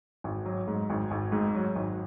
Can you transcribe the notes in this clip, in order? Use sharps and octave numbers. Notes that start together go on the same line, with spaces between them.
G#1
F#3
G#2
G#1
G#1
G#2
F#3
G#1